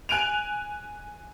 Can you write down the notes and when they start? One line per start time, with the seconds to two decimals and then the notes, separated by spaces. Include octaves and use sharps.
0.09 G#5 F#6 D7 D#7 F7